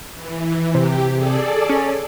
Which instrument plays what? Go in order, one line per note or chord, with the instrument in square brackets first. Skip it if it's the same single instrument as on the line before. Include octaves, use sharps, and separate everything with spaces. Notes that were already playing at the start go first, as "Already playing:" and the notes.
[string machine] E3
[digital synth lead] C3 [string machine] G4
[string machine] G#4 A4 D5
[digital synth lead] C#4